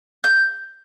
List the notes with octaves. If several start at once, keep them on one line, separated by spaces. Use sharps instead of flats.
G6